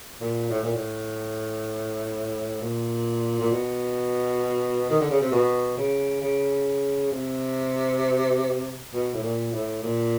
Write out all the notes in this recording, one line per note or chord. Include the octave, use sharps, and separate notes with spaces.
A#2
A2
A#2
A2
A#2
A#2
B2
D#3
D3
C#3
C3
B2
C#3
C#3
C3
B2
A2
A#2
A2
A#2